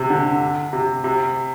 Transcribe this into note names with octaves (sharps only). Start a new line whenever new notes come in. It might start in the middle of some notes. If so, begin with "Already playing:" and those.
Already playing: C3
D3
C3
C3